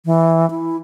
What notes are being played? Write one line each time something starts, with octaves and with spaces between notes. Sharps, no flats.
E3
E4